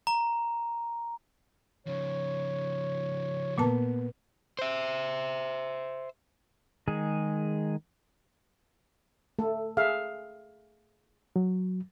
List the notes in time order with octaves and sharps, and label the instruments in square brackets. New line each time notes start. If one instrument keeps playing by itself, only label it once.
[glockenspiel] A#5
[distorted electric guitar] C#3 F3 [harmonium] C#5
[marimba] A#2 A#3 A5 [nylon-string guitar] B3
[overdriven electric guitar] C5 E5
[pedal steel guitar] D#3 G#3 G#4
[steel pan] A3 A4
G#4 E5 F5
[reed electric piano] F#3